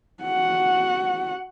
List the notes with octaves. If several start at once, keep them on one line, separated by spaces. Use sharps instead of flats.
F#4 F#5